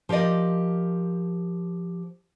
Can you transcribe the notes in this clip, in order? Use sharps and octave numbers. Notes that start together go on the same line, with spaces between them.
F3 G4 A#4 D5 D#5